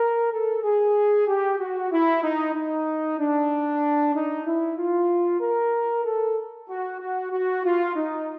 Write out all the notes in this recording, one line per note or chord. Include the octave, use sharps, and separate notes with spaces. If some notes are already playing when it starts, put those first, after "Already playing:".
Already playing: A#4
A4
G#4
G4
F#4
E4
D#4
D#4
D4
D#4
E4
F4
A#4
A4
F#4
F#4
F#4
F4
D#4